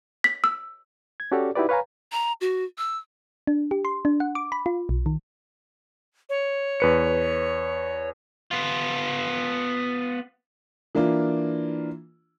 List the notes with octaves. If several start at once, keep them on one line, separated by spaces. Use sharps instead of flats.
B6
E6
G#6
C#4 F#4 G4 A4 C#5 D5
D#4 E4 F#4 G4 B4 D5
B4 C#5 F5 G#5 A#5
A#5
F#4
E6
D4
G4
C6
D4
F#5
D6
B5
F4
B1
D#3
C#5
E2 B4 C#7
B3 F4
E3 A#3 D4 E4 F4